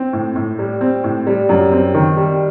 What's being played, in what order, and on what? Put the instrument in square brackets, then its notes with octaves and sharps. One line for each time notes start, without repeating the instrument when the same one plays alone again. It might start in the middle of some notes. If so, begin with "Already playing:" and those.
Already playing: [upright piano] C4
A2
A2
G3
C4
A2
G3
F#2
C4
D#3
G3